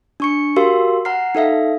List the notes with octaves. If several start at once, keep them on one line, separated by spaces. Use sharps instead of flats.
D4 C#6 C#7
F#4 G4 A#4 F5 C6 E6
F#5 A#5 F6 C7
D#4 A4 E5 F5